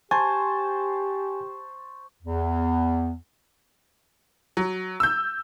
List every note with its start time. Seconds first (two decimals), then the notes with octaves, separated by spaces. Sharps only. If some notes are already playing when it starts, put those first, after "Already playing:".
0.11 G4 C5 G#5 A5 C#6
2.23 E2
4.57 F#3
5.00 E6 G6